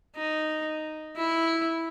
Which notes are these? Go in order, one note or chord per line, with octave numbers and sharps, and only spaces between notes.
D#4
E4